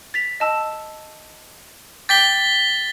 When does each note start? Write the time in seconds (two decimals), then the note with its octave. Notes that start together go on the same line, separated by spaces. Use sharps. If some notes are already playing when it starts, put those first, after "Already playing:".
0.14 A6 B6 F7
0.40 D#5 A5 E6
2.09 G5 D6 G6 A6 B6 G7